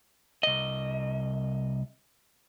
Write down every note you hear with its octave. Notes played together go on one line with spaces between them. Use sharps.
C2 D#5